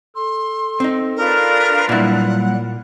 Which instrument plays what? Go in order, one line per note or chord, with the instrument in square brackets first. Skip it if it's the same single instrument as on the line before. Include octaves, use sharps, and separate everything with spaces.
[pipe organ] A4 [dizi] C6
[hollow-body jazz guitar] C4 D#4
[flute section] D4 F4 B4 [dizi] A#4
[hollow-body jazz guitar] A#2 E4 [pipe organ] F#3 G3 A#3 [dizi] F#5